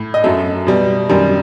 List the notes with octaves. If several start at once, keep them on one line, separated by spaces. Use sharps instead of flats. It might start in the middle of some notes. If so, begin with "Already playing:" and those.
Already playing: A2
D#5
F#2 F#3 A3 E5
B2 G3
F#2 D#3 G3